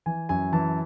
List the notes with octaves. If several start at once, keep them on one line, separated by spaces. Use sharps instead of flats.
E3 G#5
F#2 G#5
E3 A5